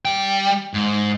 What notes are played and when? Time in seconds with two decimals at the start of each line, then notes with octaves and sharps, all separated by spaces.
0.05 G3 G5
0.74 G#2